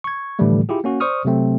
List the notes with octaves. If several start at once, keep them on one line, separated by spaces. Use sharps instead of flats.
C#6 G#6
A2 D3 E3 F3 G3 A3
E4 F4 G4 G#4
A#3 C#4 F#4
C5 D5 C#6 D#6 F6
C3 F#3 A3 C4